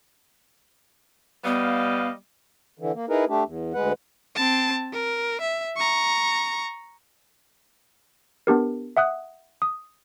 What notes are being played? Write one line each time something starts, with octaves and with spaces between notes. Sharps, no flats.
G3 B3 B4 D#5 F5
D3 E3
A#3
D#4 E4 G#4 A#4 B4
A3 D4 G4
E2
D2 G#3 B4 F#5
C4 A5
A#4
E5
A#5 C#6
B3 D4 G4 A#4
E5 F#5 D#6 F#6
D#6